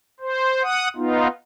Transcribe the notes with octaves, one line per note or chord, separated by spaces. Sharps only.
C5
F#5 D#6
B3 D#4 F4